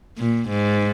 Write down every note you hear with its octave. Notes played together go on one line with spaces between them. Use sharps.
A#2
G#2